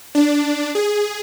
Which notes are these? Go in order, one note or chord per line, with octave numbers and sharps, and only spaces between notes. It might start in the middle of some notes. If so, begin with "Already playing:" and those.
D4
G#4